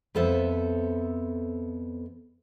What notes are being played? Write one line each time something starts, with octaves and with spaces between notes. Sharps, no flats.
F2 B3 A4 C5 E5